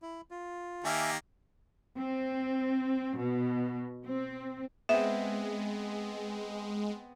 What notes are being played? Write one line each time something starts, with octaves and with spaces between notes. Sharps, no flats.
E4
F4
D#3 A#3 G4 E5 G#5
C4
B2
C4
G#3 B3 C4 E5